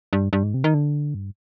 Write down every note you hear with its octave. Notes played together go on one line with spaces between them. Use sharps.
G2
G2
G#2
C3
D#3
D3
G2